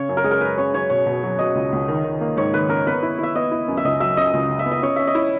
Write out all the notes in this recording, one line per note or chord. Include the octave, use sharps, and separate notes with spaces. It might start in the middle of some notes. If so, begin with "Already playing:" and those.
Already playing: C#3 C#5
F#2
A#4
G#3 G#4
A#4
F#2 B4
C#3 C#5
F#2 C#5
B2 C#5
B2
F#3
B2 D#5
C#2
C#2
D#3
D#3
A#3
G#2 C#5
D#3 B4
C#4 A#4
B3 B4
E4
E4 E5
B3 D#5
E4
F#2
E5
C#2 D#5
F#3 E5
C#3 D#5
C#2
C#3
E5
B3
D#5
C#4 C#5
C#4 E5
D#5
E4